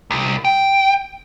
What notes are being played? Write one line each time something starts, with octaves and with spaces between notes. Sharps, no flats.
C2
G5